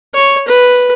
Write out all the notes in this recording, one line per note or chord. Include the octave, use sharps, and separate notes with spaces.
C#5
B4